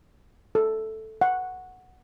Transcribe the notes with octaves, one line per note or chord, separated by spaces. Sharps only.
A4
F#5